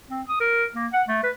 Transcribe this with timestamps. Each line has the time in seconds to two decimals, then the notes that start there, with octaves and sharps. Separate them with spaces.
0.10 C4
0.29 D#6
0.40 A#4
0.75 A#3
0.93 F#5
1.08 A3
1.23 B4